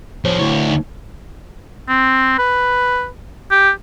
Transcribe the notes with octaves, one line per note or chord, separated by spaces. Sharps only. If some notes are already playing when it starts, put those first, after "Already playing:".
F3 G#4 C5 C#5
D2 E4 C#5
D#4
C4
B4
G4